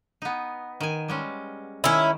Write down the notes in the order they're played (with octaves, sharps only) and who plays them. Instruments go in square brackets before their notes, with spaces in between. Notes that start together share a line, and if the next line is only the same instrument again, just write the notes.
[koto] B3 D#4
D#3 G#5
G3 G#3 C#4
[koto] D#3 [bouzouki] C#4 E4